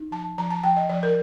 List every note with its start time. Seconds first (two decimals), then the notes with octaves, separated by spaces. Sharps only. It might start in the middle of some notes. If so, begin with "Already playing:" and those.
Already playing: D#4
0.11 F3 A5
0.38 F3 A#5
0.50 A5
0.63 F3 G5
0.77 D#5
0.89 F3 D5
1.03 A#4